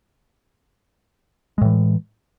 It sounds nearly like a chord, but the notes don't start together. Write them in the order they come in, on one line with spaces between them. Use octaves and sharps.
G#3 A2 E3